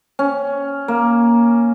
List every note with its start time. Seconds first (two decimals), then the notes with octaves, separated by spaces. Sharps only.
0.19 C#4
0.88 A#3